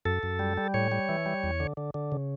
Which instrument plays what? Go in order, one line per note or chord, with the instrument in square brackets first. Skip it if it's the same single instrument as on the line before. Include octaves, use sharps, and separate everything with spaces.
[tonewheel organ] F#2 A4
F#2
G3
G3
A2 C#5
G3
E3
G3
E2
D3
D3
D3
C#3